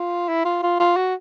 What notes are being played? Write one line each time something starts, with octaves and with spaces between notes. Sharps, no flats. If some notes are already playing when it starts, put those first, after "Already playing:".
Already playing: F4
E4
F4
F4
F4
F#4